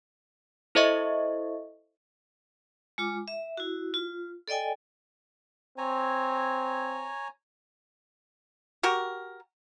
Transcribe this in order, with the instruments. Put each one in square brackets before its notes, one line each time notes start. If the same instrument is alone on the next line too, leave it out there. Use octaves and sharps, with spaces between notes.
[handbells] E4 A4 C5 D#5 E5 C#6
[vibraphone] G#3 F4 D6
E5
E4 F#4
F4
A4 D5 D#5 G5 G#5
[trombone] C4 [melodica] C#5 G#5 A#5
[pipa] F#4 G4 A#4